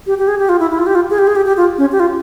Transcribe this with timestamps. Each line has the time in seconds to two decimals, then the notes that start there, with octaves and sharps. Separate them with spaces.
0.07 G4
0.18 G4
0.28 G#4
0.39 G4
0.49 F4
0.60 E4
0.71 E4
0.78 F4
0.86 G4
0.95 F4
1.10 G#4
1.18 G4
1.27 G#4
1.36 G4
1.46 G4
1.57 F4
1.78 C#4
1.92 G4
2.00 F4